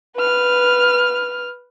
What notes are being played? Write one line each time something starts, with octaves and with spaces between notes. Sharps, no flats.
B4 F6